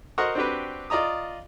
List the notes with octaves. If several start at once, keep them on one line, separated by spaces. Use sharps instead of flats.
F#4 A#4 C5 D#5 F#5 C#6
C4 D4 F#4 G4 B4
F4 D5 D#5 A#5 D#6